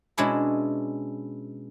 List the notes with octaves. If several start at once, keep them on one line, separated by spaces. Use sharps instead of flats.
B2 G#3 C#4 D4 E4 B5